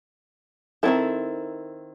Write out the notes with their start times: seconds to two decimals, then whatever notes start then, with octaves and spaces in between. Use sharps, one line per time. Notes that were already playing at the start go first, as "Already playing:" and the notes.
0.83 D#3 A3 C4 E4 A4